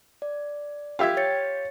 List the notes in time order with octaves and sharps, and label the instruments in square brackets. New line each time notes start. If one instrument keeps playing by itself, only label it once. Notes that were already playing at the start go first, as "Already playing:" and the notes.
[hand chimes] D5
[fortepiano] F4 G4 E5 [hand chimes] G5 G#6
[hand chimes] C#5 A6 C#7